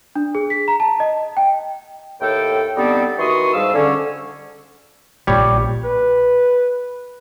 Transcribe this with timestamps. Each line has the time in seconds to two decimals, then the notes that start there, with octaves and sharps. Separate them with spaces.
0.16 D4
0.35 G#4
0.50 B6
0.68 A#5
0.80 A5
1.00 D#5
1.37 G5
2.21 D#2 A2 A4 G5
2.76 D3 G3 B3 C4 D#4 A4
3.18 D#3 E3 F#4 C6 C#6 D#6
3.54 G#2 F3 G3 F5 E6
3.74 D3 C#4
5.27 A#1 G3 C#5
5.84 B4